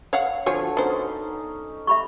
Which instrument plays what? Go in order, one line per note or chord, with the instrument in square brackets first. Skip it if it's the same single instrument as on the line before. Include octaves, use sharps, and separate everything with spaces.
[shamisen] C#5 F5 F#5
[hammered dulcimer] D3 [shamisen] F3 C#5 G#5 [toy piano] F#4
[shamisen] B3 C5 [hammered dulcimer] C#4 D#4
[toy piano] E5 B5 C#6